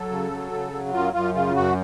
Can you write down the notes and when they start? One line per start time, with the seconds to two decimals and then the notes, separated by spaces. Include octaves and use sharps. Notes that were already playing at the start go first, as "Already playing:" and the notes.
Already playing: F#3 A4
0.11 C#3
0.31 F#3
0.52 C#3
0.72 F#3
0.93 F#2 F4
1.13 F#2 F4
1.34 C#3 F4
1.55 F#2 F#4